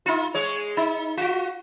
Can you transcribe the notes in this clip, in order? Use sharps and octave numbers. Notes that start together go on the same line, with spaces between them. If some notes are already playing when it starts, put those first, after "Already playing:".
D#4 F4
G#3 C#5
D#4
F4 F#4